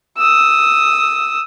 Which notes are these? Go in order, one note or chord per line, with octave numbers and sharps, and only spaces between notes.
D#6 E6